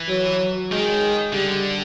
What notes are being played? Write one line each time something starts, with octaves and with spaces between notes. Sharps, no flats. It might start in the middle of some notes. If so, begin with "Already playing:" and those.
Already playing: E3
F#3
D#3 G#3
D3 G3